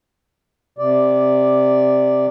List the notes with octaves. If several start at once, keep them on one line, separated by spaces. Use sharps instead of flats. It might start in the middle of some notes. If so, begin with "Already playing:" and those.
C3 D5